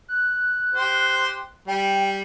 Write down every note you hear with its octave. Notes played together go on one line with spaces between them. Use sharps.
F#6
G4 C5
G3 G5